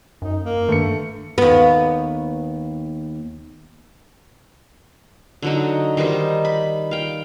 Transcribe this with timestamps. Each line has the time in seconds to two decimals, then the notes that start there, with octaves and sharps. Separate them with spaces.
0.22 F#2 D#4
0.44 A#3
0.68 G2 D#3 A3 D4 C#7
1.38 D#2 B3
5.42 D3 F#3 D#4
5.97 D#3 G3 D#4 C5
6.45 B5
6.91 F5 G5